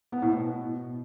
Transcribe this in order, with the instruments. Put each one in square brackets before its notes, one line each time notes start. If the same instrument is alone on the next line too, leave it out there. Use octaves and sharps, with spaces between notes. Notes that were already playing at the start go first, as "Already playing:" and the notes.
[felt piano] B3
A2
B2